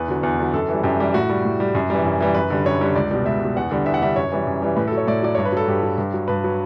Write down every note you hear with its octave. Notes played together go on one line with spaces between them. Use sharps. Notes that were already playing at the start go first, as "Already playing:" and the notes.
Already playing: E2 B4
D3 F#3
E2
D3 F#3
F#2 A4
E3 G3
F#2 G4
E3 G3
A2 F#4
G3
A2
G3
F#2
E3 G3
F#2
E3 G3
F#2 B4
D3 G3
F#2 C#5
D3 G3
C#2 D5
B2 G3
C#2 E5
B2 G3
E2 F#5
D3 G3
E2 E5
F#5
D3 G3 E5
F#2 C#5
E3 G3
F#2
E3 G3
A2 B4
A4
F#3
C#5
A2 D5
F#3 D5
G2 C#5
B4
F#3 A4
G2 G4
F#3
G2
F#3
G2 B4
F#3